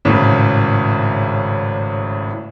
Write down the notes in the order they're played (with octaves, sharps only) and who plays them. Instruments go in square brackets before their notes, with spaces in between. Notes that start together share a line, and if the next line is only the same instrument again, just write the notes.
[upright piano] G#1 A2 C#3